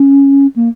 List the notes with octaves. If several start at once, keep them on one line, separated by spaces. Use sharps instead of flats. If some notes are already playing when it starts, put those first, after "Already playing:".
Already playing: C#4
A#3